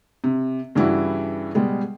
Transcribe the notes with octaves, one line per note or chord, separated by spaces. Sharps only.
C3
G2 C#3 E3 G3 E4 F#4
B2 G3 G#3